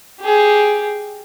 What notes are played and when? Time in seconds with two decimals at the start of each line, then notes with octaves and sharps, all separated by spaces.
0.21 G4 G#4